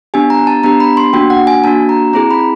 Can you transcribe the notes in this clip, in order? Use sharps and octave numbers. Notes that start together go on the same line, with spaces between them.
B3 D4 G4 G#5
A#5
A5
B3 D4 G4 A#5
B5
C6
A#3 D4 F#4 G5
F#5
G#5
A#3 D4 F#4 A5
A#5
C4 E4 G#4 A#5
B5